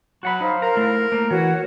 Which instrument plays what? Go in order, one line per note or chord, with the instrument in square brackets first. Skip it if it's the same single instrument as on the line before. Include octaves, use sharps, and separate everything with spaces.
[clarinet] F#3 [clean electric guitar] F#4 F#5 B5
[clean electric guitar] D#4 [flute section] C5 F5
[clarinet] A#4 [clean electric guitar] A#5
[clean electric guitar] A3 E4
A3 A#3
[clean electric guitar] E3 [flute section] F#4 C#5 F#5